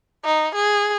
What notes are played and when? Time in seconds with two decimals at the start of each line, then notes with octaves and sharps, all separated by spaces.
0.25 D#4
0.55 G#4